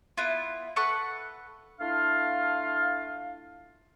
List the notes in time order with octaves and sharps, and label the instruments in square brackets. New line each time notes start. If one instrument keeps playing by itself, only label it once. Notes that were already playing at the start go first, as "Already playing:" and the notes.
[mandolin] B3 E4 F4
A4 B4 F#5 C#6
[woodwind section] A3 D4 E4 F4 F5